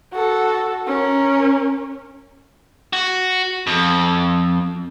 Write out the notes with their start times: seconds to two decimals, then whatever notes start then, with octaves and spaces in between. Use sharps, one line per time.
0.13 F#4 A4
0.88 C#4 A#4
2.93 F#4
3.67 F2